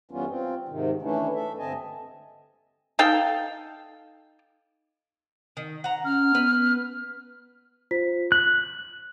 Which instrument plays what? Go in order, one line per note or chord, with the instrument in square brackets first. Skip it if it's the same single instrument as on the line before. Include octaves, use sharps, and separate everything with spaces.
[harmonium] F#2 E3 G3 B3 C#4 F4
C4 F4
G#2 C3 D#3
E3 A3 C#4 D4 E4
A4 E5
G2 D3 C4 D#5 G#5 A5
[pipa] D#4 A4 F5 G5
[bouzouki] D#3
F#5 A#5
[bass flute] C#4 [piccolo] F6
[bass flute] B3 [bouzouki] B4
[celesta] F4 C5 B6
[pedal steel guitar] F#6 [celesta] F#7